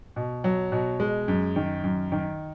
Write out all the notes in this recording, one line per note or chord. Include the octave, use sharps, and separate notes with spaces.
B2
F#3
B2
G#3
F#2
D#3
F#2
D#3